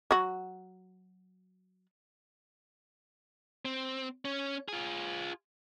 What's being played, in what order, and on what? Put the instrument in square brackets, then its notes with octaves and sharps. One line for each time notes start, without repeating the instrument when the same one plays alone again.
[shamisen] F#3 F#4
[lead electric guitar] C4
C#4
F4 G#4